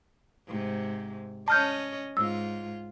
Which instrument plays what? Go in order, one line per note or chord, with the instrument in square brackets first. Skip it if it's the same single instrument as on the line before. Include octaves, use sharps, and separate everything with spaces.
[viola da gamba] G#2 C3
[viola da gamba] C#4 D#5 [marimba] A5 F6 G6
[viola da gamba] G#2 F4 [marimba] E6